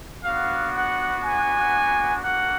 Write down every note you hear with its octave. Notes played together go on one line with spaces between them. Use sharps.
B3 D4 F#4 F5
F#5
G#5
A#3 D4 F#4 F#5